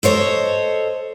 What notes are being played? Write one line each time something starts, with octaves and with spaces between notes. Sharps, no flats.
A4 C5 C#5 D#5